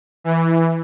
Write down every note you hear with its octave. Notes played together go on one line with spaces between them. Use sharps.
E3